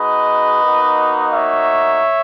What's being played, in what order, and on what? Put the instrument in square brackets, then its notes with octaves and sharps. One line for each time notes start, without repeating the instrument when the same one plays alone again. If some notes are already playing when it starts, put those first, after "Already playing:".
Already playing: [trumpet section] G#3 D#4 F#4 B4 D#5
A#3 D#4 F#4
C#5 E5